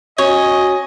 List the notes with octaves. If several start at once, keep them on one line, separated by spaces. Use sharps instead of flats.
C#4 F#4 C#5 D#5